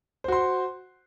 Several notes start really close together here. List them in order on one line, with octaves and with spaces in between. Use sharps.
C5 F#4 C6